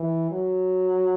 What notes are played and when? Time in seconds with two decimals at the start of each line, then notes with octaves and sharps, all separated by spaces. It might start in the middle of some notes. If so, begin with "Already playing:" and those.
Already playing: E3
0.31 F#3